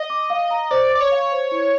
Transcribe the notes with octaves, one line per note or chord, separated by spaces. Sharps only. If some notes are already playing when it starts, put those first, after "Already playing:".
Already playing: D#5
D6
F5
A#5
C5 D5
D5 D6
C#5
F5
C5
E4